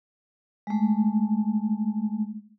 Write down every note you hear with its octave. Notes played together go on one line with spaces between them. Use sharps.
G#3 A3